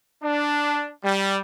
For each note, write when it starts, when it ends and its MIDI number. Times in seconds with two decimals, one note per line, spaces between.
0.23 0.90 62
1.04 1.39 55